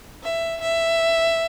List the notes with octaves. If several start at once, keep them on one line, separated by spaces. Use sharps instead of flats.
E5
E5